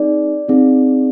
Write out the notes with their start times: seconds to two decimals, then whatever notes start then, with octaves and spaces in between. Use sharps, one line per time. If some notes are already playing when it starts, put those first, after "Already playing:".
Already playing: C4 D#4 G#4 D5
0.48 C4 D#4 G#4